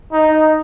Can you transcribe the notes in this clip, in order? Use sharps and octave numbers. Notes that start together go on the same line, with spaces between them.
D#4